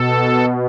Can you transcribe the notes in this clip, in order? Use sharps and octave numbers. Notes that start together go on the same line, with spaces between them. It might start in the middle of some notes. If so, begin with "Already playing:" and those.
Already playing: B2 A4